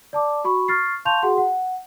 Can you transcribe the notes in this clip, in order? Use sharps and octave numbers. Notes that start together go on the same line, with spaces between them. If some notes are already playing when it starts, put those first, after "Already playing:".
D5 A5 D6
F#4 B5 C#6
C#6 F6 A6 C7
F5 A5 C6 C#6 G6 F7
F#4 G#4 F#5 C6
F#5